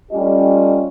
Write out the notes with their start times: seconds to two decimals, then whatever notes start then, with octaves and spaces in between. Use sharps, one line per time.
0.12 G3 A3 C#4 F4 G4 D#5